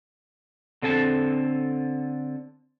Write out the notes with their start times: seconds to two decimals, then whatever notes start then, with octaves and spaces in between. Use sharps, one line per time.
0.82 D3 C4 A4 G#5 A5